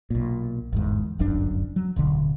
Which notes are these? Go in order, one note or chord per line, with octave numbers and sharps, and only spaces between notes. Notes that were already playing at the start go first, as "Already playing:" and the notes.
B1 A#2
G1 E2 G#2
D1 G1 F#2 D4
F#3
D1 B1 D3